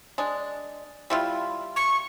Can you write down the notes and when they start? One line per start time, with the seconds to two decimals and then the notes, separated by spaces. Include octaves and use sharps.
0.18 G#3 D4
1.10 G3 E4 F4
1.76 C#6